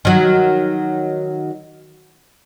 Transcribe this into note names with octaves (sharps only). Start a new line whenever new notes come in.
D#3 F#3